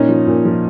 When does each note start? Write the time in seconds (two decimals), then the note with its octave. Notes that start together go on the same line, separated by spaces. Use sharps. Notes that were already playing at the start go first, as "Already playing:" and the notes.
Already playing: A#2 C#4 D#4
0.09 F3
0.27 A#2
0.45 F3